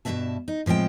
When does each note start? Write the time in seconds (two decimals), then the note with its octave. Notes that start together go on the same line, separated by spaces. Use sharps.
0.05 G2 B2 E3 A#3 E5 A5
0.48 D#4
0.66 A2 F3 G#3 C4 G5